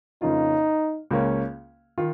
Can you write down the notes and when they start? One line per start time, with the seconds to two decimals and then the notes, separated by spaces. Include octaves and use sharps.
0.22 F2 C#3 A#3 C#4 D#4 F4
1.11 C#2 C#3 A#3 C#4
1.98 D#3 F4